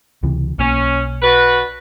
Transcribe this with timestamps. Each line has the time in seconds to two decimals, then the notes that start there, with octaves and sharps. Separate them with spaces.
0.23 C#2 C3 E3
0.59 B1 B2 A#3 C#4
1.22 D4 F#4 B4